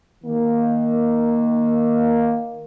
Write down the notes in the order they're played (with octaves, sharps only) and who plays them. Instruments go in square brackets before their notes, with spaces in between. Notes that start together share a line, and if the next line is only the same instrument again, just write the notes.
[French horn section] D#3 A#3